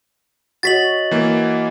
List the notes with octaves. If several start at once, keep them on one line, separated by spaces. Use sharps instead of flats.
F#4 C#5 D#5 A6 B6 F#7
E3 A#3